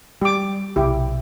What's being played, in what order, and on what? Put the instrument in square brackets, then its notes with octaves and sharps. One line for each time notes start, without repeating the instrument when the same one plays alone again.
[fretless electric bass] G3 [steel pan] G4 D6
[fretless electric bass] B1 C3 [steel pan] E4 G4